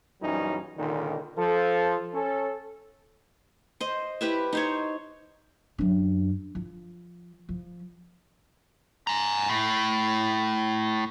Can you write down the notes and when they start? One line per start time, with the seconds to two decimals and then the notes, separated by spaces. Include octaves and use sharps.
0.22 A#1 F#2 E3 G3 C#4 D#4
0.78 C#2 A#2 D3 D#3
1.36 F3 A4
2.14 C#4 A4
3.80 C5 D#5
4.21 E4 G4 B4 E5
4.53 D#4 C5 C#5
5.78 F#2 D4
6.55 F3
7.49 F3
9.07 G#5 A#5
9.50 A2